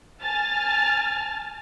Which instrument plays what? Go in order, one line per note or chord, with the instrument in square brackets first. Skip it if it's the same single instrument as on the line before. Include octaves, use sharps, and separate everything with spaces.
[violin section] G#5 A5 F6 A6